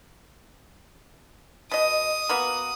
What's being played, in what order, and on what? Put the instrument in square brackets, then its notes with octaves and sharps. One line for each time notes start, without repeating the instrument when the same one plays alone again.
[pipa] B2 D#5 [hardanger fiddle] D#6
[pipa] A#3 B3 F#4